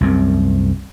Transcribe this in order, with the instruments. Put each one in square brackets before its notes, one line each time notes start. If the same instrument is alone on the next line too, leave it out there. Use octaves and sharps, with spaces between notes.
[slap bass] C2 F#2 C3